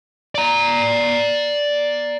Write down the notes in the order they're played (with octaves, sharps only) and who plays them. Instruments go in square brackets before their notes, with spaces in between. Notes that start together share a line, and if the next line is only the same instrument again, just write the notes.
[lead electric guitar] D5 A#5